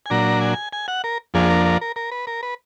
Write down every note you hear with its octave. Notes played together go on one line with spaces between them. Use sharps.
G#5
A#2 F#3 D4 A#5
G#5
G#5
F#5
A#4
F2 F3 A#3 D4 G#4
A#4
A#4
A#4
A#4
B4
A#4
B4